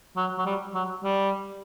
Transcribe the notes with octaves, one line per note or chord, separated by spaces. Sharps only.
F#3
F#3
G3
F#3
G3